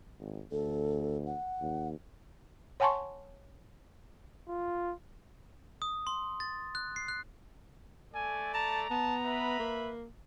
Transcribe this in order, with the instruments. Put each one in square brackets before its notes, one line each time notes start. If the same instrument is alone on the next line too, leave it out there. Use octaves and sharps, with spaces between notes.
[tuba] G#1
[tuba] D2 [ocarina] A4
[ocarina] F#5
[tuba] D#2
[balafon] C#5 F#5 G#5 A5 C6 C#6
[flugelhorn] F4
[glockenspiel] D#6
C6
A6
F#6
C7
F#6
[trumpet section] A3 A4 D5 [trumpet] G#5
[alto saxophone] A5 [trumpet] A#5
[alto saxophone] B3 [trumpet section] A5
[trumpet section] B4 E5 B5
[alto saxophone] A#3